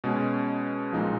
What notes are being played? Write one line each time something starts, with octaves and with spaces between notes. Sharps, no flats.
B2 G#3 C#4 G#4
B1 A#2 F3 G#3 D#4